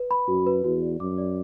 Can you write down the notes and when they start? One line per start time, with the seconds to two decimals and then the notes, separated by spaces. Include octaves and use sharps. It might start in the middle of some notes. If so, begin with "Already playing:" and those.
Already playing: B4
0.11 B5
0.28 F#2 F#4
0.47 B4
0.64 E2 F#4
0.82 D5
1.00 F#2 D6
1.18 D5